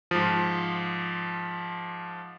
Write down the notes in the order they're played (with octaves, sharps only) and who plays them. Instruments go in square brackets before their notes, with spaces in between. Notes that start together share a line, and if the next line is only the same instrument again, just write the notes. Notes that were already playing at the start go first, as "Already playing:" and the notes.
[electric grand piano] G#2 F3